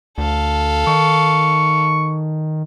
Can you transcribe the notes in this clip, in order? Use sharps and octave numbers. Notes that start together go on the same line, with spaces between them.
D2 A4 F5
D#3 C#6